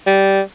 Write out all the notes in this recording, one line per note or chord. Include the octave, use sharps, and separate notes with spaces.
G3